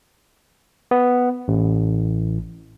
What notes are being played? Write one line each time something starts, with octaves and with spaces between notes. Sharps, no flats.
B3
A1